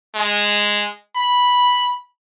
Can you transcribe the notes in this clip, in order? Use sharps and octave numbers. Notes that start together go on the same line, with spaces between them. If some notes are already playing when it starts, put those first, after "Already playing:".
G#3
B5